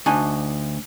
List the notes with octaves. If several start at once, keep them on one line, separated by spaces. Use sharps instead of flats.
D2 D4 D#4 G#5